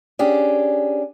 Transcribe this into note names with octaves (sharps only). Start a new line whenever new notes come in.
C#4 D4 G4 G#4